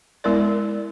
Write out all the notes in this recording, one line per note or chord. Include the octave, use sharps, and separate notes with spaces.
G#3 B3 E4 A#4 D5